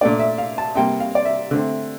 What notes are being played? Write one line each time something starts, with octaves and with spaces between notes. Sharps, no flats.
A#2 A3 D4 D5
E5
F5
A5
C3 G3 A#3 G5
F5
D5
E5
D3 A3 C4